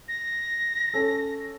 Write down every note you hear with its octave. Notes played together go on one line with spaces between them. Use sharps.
A#6
C#4 A4